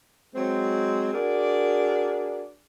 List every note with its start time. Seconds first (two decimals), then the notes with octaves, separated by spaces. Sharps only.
0.35 F#3 G#3 C4
1.12 D4 F#4 G#4 A#4 D5